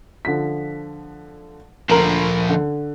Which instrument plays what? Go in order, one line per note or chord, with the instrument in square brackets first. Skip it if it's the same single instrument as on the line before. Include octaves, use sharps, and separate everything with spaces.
[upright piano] D3 F3 B6
[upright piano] D2 A#4 F#7 [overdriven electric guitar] F3 A#3
[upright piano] D3